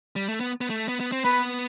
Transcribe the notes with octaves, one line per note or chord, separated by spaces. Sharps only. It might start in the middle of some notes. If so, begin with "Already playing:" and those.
G3
A3
B3
B3
A3
B3
B3
C4
B3 B4